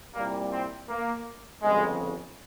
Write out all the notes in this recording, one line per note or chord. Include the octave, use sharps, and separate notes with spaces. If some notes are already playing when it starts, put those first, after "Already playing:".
C2 A#2 G3 A#3
C4
A#3
G1 F2 C#3 G3 G#3